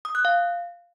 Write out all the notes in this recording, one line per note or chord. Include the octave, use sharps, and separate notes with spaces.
D#6
F#6
F5